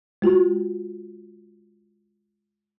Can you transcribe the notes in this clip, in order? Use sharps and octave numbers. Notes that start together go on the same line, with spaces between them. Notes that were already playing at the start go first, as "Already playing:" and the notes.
G#3 F4 F#4